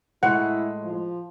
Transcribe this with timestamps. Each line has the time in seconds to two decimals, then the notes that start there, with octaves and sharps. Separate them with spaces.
0.23 A2 G#3 E4 F#5
0.83 F3